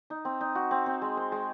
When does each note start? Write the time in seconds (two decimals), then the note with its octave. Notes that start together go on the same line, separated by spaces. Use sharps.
0.10 D#4
0.25 C4
0.41 D#4
0.55 F#4
0.71 C4
0.86 C4
1.02 G#3
1.17 C5
1.32 G#3